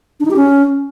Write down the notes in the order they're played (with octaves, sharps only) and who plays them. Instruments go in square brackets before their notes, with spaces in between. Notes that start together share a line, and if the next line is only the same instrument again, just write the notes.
[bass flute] D4
D#4
G4
C#4